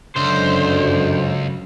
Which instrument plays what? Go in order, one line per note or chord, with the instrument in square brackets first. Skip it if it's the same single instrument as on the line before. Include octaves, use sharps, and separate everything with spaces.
[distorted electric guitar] C#2 [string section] F#2 [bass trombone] D3 [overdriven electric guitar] C5